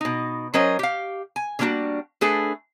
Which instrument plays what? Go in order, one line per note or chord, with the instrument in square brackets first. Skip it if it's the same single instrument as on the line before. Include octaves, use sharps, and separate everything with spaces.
[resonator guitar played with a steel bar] B2 D#4
F#3 C#4 A#4 C5 D#5
G4 F5
G#5
D3 G3 A#3 D4 F#4
A3 D4 G#4 A4 B4